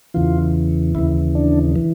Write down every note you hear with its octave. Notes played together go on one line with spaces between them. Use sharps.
E2 C#3 E3 F4
D#2 C#3 E3 E4
D4
E3